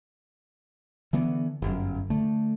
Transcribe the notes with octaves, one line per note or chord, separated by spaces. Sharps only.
D3 E3 B3
G1 F#2
D3 A3